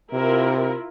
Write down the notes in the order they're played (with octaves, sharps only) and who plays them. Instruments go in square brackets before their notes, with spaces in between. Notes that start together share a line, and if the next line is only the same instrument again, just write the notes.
[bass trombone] C3 [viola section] E4 F4 A#4